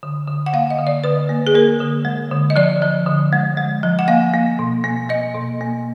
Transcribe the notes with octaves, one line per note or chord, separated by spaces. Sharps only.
D3
D3
F#5
A#3 F5
D#5
D3
D5
D3 B4
A#3
G#4
A#3 A#4
D3
G#3
D3
D#5
F3 D5
F3
D3
G#3
G#3
F3
F#5
A#3 F5
A#3
B2
A#3
A#3 D#5
B2
A#3